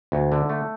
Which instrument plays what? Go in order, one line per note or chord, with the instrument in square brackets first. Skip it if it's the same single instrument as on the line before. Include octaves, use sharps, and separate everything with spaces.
[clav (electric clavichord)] D2
D3
A3